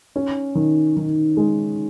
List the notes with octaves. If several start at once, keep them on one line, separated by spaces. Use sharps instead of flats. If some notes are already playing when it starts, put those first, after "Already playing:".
C#4
D#3
D#3
G#3